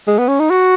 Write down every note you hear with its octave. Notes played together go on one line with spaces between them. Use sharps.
G#3
B3
C#4
D#4
F#4